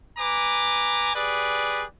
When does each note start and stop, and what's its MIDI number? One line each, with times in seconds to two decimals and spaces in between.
0.18 1.10 71
0.18 1.10 80
0.18 1.10 82
0.18 1.10 86
1.15 1.84 67
1.15 1.84 68
1.15 1.84 71
1.15 1.84 74